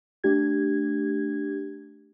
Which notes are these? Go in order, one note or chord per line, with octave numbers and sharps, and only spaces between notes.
A3 D4 G4 G#6